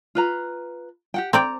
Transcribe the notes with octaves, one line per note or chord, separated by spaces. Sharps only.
F4 B4 A#5
G4 F#5 G5
C4 D5 G5 A#5